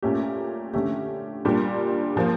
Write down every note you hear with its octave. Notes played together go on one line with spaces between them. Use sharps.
A#2 A3 C#4 G4
D3 A3 C#4 G4
A#2 G3 D4 G4
A#2 F3 A#3